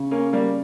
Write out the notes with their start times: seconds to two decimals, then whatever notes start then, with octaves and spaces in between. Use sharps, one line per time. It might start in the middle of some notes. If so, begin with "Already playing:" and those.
Already playing: C#3
0.11 A#3 C#4
0.33 G3 A#3